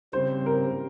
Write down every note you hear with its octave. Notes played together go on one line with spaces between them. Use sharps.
C#3 G3 C4 C5
A#4